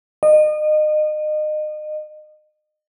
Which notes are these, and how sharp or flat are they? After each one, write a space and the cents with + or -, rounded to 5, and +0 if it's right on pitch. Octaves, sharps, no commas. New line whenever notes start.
D#5 -30